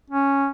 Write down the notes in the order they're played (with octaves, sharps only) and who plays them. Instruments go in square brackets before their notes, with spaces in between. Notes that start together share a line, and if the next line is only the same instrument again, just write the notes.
[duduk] C#4